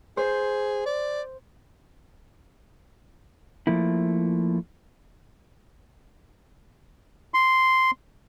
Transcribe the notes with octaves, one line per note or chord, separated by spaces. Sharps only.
G#4 C5
D5
F3 A3 A#3 E4
C6